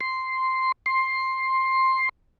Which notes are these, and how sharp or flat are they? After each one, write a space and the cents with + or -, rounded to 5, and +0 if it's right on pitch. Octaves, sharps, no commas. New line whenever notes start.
C6 -5
C6 +10